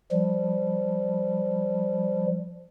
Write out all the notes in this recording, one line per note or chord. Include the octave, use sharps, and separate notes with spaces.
F3 G3